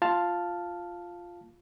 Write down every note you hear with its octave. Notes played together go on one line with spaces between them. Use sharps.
F4 F5 A5 F6